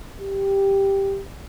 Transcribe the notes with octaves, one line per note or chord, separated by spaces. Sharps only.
G4